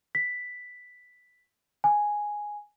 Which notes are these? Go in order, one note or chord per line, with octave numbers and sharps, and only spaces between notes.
B6
G#5